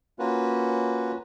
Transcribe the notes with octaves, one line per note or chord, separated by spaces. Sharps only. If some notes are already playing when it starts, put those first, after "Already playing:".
A#3 C#4 F4 F#4 B4